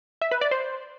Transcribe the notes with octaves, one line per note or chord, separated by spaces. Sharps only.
E5
B4
D5
C5